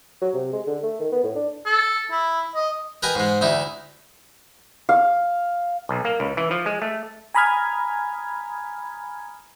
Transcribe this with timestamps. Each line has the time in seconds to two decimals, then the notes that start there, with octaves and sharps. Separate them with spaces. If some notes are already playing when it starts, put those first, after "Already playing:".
0.21 F#3
0.34 C3
0.53 G#3
0.67 D3
0.83 A3
1.00 D#3
1.12 B3
1.23 A2
1.35 D4
1.66 A4
2.11 E4
2.55 D#5
3.03 A#4 B4 D#5 G5 G#5
3.15 G#2 G#3
3.41 D2 D#4 E4
4.89 F5
5.89 B1
6.05 A#3
6.20 C#2
6.37 E3
6.51 F3
6.66 G#3
6.82 A3
7.34 G#5 A#5 B5 D#6 F6 G#6